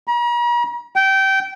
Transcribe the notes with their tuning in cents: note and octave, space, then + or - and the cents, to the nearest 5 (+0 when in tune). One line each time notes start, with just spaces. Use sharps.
A#5 +45
G5 -20